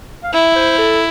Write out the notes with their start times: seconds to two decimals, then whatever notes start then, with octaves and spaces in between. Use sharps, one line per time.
0.23 F5
0.33 E4 E5
0.56 C5
0.78 A4